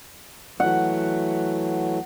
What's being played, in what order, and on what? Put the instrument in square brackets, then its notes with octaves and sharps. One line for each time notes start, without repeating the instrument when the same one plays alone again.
[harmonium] E3 F#3 A3 [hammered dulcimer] F#5